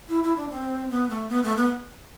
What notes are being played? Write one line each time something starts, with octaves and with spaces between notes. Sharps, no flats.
E4
E4
D4
C4
B3
A3
B3
A3
B3